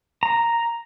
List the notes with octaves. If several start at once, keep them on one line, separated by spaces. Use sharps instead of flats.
A#5